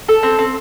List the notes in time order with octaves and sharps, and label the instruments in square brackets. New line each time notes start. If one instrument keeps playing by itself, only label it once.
[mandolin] A4
C4
C4